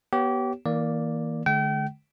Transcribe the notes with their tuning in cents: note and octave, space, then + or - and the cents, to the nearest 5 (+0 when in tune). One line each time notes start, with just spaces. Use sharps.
B3 -20 G4 -25 C#5 +0
E3 -45 A#3 +0 D5 +0
D3 +0 G#3 +40 G5 -35